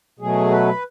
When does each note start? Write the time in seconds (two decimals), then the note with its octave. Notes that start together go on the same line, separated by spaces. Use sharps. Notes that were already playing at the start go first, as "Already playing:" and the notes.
0.19 B2 F#3 A3 G#4
0.51 B4